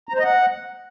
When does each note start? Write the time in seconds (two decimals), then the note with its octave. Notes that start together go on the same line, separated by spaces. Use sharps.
0.09 A#5
0.14 C5
0.19 D#5
0.24 F#5